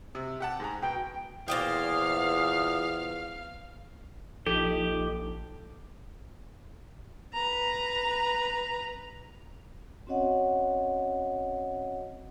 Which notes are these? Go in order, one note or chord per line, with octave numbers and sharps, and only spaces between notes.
C3
G4 F#5 A5
G#2 G#4 A#5
B2 G5
E2 A#2 C5 F5 G5 D#6
A#1 F3 D#4 G4 A4
B4 A#5
C4 C#4 F#4 C#5 D#5 F#5